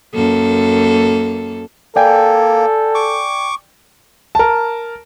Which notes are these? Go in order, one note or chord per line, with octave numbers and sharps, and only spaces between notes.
F#2 A#3 A4
A#3 A4 D5 G5 G#5
C#6 D6
A#4 A5